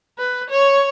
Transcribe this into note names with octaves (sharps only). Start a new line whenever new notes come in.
B4
C#5